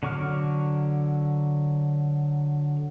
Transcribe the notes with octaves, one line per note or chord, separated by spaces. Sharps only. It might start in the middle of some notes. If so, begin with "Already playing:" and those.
D3 F#3 C#6 D6 F6